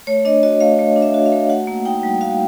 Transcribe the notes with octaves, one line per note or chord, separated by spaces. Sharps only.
A3 C#5
D4 D#5
F#4 D#5
A3 F5
A3
D4
E5
F#4
F5
A3
F#4 F#5
A#3
D#4 G5
G3
F#4 F5